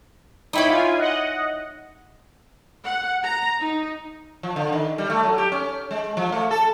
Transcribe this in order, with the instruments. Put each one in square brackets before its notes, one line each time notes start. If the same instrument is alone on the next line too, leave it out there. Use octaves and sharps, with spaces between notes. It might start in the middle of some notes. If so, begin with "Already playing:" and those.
[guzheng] D#4 E4 C#5 [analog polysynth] G5 B5 D6
[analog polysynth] F4 G#5
D#5 F#5
[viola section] F#5
A#5
D#4
[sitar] F3
D3
D#3
G3
A3
F#3
G4
C#4
G#3
F3
A3
A4